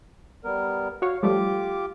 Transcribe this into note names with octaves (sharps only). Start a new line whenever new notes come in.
G3 B3 A#4
F#4 C#5 F5
F3 G3 A3 F4 G4 D6